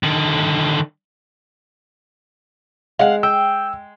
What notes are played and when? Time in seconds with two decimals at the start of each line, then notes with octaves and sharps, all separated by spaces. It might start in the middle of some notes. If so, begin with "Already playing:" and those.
0.03 D3 D#3
2.99 G#3 F5 F#5
3.23 G5 E6